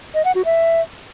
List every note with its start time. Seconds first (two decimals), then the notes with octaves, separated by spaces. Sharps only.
0.15 D#5
0.25 F#5
0.35 F#4
0.45 E5